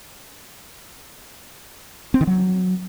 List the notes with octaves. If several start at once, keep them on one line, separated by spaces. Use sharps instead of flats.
C4
D#3
F#3